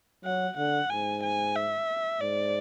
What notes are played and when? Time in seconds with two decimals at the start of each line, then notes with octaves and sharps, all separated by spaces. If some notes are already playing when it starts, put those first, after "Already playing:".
0.25 F#3 F#5
0.57 D3 F#5
0.90 G#2 G#5
1.23 G#5
1.55 E5
2.21 G#2 D5